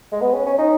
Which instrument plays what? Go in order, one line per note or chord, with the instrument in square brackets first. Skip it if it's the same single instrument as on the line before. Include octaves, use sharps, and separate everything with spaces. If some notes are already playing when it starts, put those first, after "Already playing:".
[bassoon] G#3
B3
C#4
C#4
D#4